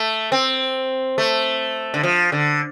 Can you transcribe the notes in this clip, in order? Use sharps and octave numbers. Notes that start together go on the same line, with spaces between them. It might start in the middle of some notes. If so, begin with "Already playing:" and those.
Already playing: A3
C4
A3
D3
F3
D3